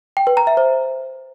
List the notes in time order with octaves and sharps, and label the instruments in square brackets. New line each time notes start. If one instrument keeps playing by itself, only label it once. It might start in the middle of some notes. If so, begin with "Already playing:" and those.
[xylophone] G5
B4
A#5
E5
C5